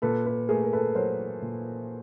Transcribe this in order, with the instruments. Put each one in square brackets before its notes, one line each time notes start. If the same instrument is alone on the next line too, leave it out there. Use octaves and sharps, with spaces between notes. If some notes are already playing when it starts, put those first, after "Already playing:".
[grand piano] A#2 [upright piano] A4 B4
[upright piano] A4 B4
[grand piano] A3 [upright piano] G#4 A#4
[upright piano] A#4
A4 B4
[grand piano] F#3 [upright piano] A#4 C5
[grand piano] A#2